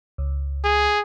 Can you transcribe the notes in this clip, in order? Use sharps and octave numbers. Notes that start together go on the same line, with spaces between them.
C#2
G#4